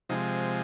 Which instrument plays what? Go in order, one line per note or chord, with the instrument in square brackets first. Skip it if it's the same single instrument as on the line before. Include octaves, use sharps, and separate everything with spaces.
[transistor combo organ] C3 F3 G#3 D#4